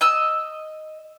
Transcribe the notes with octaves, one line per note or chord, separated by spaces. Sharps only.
D#5 E6